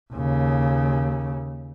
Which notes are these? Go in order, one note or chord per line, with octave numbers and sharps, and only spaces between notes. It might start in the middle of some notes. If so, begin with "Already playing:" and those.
D#2 C#3